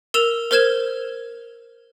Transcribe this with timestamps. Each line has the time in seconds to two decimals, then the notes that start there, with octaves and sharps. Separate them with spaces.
0.14 A#4 E6 E7 F7
0.51 A#4 C5 F6 G#6 E7